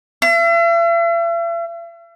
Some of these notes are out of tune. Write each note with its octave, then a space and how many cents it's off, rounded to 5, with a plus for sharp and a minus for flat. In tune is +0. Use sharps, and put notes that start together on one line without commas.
E5 +45